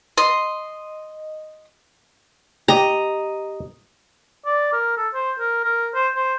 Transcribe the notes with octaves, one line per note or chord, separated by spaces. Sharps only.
D#5 C6
G4 D#5 A#5
D5
A#4
A4
C5
A#4
A#4
C5
C5